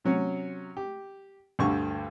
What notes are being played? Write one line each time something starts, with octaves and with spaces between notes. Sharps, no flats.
C3 F#3 C#4
G4
D2 G2 D3 C#6